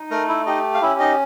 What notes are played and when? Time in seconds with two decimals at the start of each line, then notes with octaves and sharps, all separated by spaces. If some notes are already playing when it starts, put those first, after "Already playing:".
Already playing: D#4
0.11 A3 A#4 A#5
0.28 E4 E5
0.46 D#4 G4 D#5
0.74 F5
0.82 C#4 E4 E5
1.00 D#4 D#5